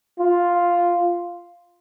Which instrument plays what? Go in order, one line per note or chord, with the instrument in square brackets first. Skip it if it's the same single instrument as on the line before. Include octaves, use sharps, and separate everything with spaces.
[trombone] F4